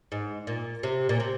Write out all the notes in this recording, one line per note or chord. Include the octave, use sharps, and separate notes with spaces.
G#2
A#2
C3
A#2
C3